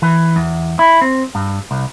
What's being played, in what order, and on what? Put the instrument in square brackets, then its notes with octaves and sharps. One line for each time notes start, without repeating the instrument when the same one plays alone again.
[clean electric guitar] E3
E2
E4
C4
G2
C2